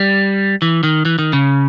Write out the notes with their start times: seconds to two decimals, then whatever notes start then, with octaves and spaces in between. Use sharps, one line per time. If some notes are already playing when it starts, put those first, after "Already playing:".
Already playing: G3
0.62 E3
0.83 D#3
1.05 E3
1.19 D#3
1.33 C#3